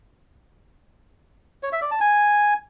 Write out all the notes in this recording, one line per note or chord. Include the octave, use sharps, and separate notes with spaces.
C#5
E5
D5
A5
G#5